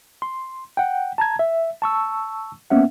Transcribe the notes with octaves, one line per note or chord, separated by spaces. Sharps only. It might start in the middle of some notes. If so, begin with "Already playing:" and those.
C6
F#5 G5
A5 A#5 G#6
E5
A5 C#6 E6
A#3 B3 C#4 E5 F#5